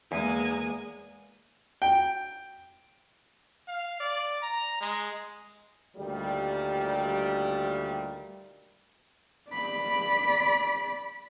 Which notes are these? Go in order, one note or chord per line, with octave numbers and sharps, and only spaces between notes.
E2 G#3 A#3 G#5
G5
F5
D5
A#5
G#3
D2 A#2 D#3 G3
D5 B5